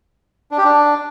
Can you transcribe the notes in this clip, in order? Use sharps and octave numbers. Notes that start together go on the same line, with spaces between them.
D4
G4
D4